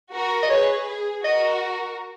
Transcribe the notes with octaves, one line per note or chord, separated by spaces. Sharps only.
F#4 A#4
D#5
G#4 B4 C#5
G#4
F#4 A#4 D#5